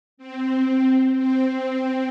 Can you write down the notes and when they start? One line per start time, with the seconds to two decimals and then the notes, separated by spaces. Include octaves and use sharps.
0.17 C4
1.16 C4